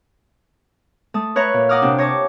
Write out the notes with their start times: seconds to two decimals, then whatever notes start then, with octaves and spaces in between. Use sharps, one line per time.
1.14 A3 A5 D#6
1.36 B4 C#5 E5 A#5
1.54 A#2
1.69 D#5 F#5 A#5 D6 D#6 F6
1.82 C3 D4 G5
1.98 C#5 D#5 A5 D6